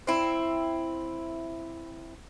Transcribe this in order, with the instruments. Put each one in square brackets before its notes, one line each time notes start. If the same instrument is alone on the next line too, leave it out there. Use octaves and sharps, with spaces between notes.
[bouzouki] C4 E4